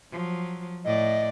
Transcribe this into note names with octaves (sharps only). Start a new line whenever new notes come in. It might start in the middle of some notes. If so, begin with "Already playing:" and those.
F3 F#3
A2 D5 D#5